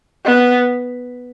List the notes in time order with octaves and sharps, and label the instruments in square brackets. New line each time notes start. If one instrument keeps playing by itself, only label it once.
[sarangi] B3